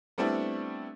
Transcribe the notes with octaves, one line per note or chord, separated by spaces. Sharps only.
G3 A3 B3 C4 D4 E4